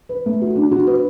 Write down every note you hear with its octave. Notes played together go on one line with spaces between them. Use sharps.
B4
A3
F#4
D4
F#4
B4